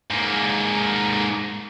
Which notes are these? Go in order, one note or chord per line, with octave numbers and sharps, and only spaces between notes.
G#2 A#3